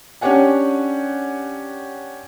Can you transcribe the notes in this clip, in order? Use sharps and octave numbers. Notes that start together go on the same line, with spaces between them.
C#4 D4 G4 C#5 F#5 G#5